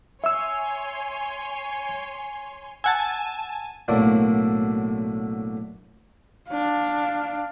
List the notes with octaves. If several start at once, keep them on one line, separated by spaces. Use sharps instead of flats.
C#5 E5 G#5 C6 E6
F#5 G#5 A5 E6
B1 A2 D3 F#3 A#3 D4
D4 F5